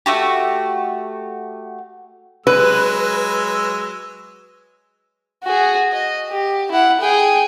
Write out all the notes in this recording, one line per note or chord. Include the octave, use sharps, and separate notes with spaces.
A3 F#4 G4
F#3 G#3 B4 E6
F#4 G#4
D#5
G4
E4 F#5
G#4 G5